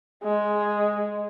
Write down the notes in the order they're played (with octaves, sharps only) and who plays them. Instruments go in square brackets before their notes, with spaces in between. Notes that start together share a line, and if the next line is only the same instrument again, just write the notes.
[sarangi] G#3